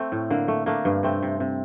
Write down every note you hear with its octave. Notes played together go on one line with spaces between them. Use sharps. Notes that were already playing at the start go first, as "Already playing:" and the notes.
Already playing: A3 C4
A2
D3 A#3
A3
A3 A#3 D4
G2
C3 A3 C4
C3
C3